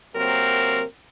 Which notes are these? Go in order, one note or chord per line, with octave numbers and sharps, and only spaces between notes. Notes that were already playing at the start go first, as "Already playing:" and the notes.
C3 F#3 A#3 C4 A#4